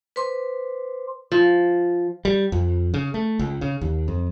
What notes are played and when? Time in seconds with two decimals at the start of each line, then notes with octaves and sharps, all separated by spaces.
0.16 B4 C5 C6 D6
1.32 F3
2.25 G3
2.52 F2
2.94 C#3
3.14 A3
3.39 C#2
3.61 C#3
3.81 D#2
4.08 F2